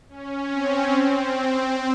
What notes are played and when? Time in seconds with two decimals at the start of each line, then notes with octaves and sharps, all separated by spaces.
0.09 C#4
0.50 C4
0.90 C4